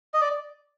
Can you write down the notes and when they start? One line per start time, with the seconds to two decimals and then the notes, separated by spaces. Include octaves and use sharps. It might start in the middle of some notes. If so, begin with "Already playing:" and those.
0.14 D#5
0.21 D5